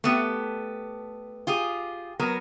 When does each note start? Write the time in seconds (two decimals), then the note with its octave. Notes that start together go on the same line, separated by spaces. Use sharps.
0.04 A3 B3 G4
1.47 F4 G4 G#4
2.20 F#3 B3 A#4